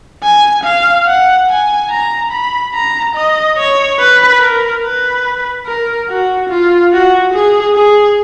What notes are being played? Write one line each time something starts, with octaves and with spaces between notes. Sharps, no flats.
G#5
F5
F#5
G#5
A#5
B5
A#5
D#5
C#5
B4
A#4
B4
A#4
F#4
F4
F#4
G#4
G#4